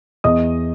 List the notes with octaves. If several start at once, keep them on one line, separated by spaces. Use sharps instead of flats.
E2 D#5 D#6